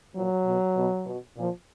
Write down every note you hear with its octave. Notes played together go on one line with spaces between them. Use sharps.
A#2 F3 F#3
B2
B2
B2
A#2 F3